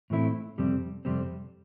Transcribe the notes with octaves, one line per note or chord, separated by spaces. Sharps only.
A2 E3 A3 C4 E4
F2 C3 G3 C4
F2 C3 G3 C4